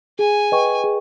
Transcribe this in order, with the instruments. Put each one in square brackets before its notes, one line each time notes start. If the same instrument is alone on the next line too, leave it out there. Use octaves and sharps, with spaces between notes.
[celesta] G#4 [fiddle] G#5
[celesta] B4 D#5 G5 C#6
G#4